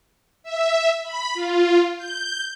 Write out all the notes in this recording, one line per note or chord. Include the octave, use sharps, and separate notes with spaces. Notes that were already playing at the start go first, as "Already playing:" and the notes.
E5
B5
F4
G6